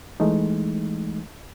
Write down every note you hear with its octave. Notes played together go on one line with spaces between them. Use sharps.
E3 G#3 A3 D#4